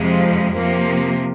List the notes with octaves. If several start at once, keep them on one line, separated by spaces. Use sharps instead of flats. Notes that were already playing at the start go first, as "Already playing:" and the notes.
Already playing: F2 C3 F3 G#3
C3 F3 A#3